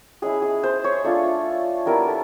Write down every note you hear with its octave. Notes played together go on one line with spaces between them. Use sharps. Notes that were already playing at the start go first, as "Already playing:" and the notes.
G#3 C#4 E4 G#4
G#4
C5
C#5
A3 D4 F4
G3 B3 E4 A#4
A4